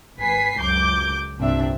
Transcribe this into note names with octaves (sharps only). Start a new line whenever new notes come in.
G#1 B4 G#5 B6 C7
C#2 F#2 D6 G6
C2 G2 A#2 C4 D4 E5